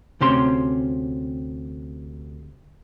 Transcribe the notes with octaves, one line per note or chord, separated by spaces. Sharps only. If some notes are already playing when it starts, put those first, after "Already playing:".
D2 C3 C#4 C6